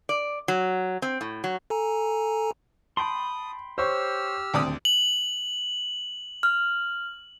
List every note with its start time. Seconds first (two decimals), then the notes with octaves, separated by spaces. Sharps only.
0.09 D5
0.48 F#3
1.02 C4
1.21 A2
1.44 F#3
1.70 A4 G#5 A#5
2.97 G5 A5 B5 C6 D#6
3.78 G4 C5 C#5 C#6 E6 F6
4.54 D#1 D2 C4 D5 D#6
4.85 F#7
6.43 F6